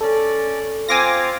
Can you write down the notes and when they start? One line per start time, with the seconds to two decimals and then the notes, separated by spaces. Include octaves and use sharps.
0.01 C#4 A4 D5
0.89 C4 F4 F5 G#5 D6 A#6